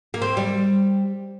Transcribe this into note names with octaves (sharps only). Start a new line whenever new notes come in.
A#3
C4
G3